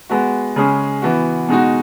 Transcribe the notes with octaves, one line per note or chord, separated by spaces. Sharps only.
G#3 B3 F#4
C#3 G#3 C#4 G#4
E3 B3 F#4
B2 G#3 D#4 F#4